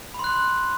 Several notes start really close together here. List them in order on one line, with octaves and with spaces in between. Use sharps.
B5 C6 F#6